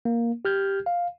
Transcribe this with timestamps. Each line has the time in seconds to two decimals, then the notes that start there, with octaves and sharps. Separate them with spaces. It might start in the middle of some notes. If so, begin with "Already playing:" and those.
0.05 A#3
0.45 G4 F6 G6 G#6
0.86 F5